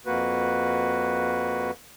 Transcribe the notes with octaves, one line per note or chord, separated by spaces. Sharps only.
F2 A#3 F#4 B4